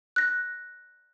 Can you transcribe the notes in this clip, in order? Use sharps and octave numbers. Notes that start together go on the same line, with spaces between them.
F#6 A#6